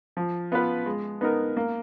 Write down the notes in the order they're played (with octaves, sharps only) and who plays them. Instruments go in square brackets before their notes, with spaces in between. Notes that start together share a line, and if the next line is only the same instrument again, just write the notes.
[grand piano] F3
B3 F4 B4
G#3
B3 D#4 A#4
A#3